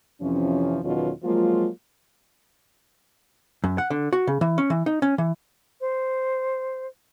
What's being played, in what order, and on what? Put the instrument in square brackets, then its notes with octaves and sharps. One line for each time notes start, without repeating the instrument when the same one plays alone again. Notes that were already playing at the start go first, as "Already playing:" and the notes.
[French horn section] F2 C3 E3 F3 C#4
E2 B2 D#3 F#3 C#4 F4
F3 F#3 G#3 A#3 F4
[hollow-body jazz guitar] F#2
F#5
D3
F#4
C#3
E3
C#4
E3
D#4
C#4
E3
[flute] C5